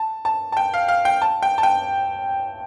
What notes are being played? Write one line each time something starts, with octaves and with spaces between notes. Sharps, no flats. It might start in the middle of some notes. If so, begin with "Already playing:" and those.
Already playing: A5
A5
A5
G5
F5
F5
G5
A5
G5
A5
G5